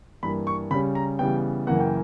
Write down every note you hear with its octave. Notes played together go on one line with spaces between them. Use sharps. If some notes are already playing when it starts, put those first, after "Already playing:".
G2 E3 A#3 B5
C#6
C#3 G3 C#4 B5
A#5
C#3 E3 G3 B3 G5
F#2 C#3 E3 A#3 F#5
G5